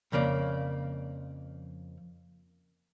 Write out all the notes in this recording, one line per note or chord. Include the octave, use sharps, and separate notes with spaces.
F2 C#3 A#3 D5